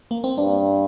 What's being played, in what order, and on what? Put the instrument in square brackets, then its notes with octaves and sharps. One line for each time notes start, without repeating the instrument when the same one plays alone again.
[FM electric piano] A#3
C4
[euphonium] G2 [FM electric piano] D4